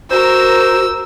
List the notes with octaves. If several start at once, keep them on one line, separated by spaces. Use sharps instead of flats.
F#4 A#4 C5 E6